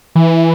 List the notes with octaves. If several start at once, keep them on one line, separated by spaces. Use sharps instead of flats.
E3